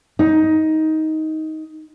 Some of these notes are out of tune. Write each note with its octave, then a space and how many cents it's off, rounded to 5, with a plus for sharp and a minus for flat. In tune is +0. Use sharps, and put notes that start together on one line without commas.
D#4 +15